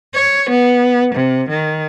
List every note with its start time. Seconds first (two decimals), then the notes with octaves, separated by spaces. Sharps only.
0.13 C#5
0.50 B3
1.15 C3
1.50 D#3